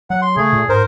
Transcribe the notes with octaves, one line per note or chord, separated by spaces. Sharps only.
F#3 F#5
C6
C#3 A3 G#4
A#2
G#2 A#4 C5